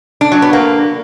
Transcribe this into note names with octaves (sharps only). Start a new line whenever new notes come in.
D4
F#3
B3
A#3